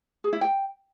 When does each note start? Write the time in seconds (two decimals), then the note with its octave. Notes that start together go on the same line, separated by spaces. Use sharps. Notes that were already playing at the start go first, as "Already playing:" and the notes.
0.24 G#4
0.33 E4
0.41 G5